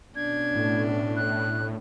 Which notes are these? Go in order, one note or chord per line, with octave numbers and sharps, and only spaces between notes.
B2 C#4 D4 G#6
A2
F#6